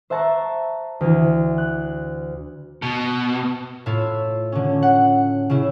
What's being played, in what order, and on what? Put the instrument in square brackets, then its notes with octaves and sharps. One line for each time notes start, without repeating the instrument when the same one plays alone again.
[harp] C5 E5 F#5 A5 A#5 C#6
D2 E3
F#6
[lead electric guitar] B2
[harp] A2 E4 F4
D3 C#4
F#5
C#3 E4